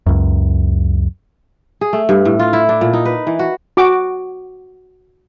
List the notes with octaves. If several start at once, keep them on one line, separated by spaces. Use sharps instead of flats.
C#2 F#2
G#4
A3
G2
A2
F4
E4
D4
A#2
D#4
B4
E3
F#4
F#4 D6